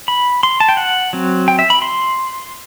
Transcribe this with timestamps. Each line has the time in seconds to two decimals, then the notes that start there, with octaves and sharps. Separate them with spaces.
0.08 B5
0.43 C6
0.60 A5
0.69 G5
0.77 F#5
1.13 F#3 C4
1.48 G5
1.59 E5
1.70 B5
1.82 C6